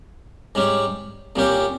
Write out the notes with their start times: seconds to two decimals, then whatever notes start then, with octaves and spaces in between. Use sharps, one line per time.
0.55 G#2 G3 C#4
1.36 C2 A#2 G3 C#4 G4